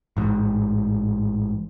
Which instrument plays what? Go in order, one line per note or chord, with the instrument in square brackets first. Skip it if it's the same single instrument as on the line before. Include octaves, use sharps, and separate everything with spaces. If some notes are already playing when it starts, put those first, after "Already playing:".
[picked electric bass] A1 G#2